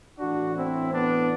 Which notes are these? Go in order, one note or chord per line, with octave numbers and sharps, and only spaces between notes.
A2 E3 D4 F#4
C4 E4
B3 D4